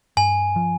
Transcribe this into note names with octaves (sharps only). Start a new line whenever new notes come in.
G2 G#5
F3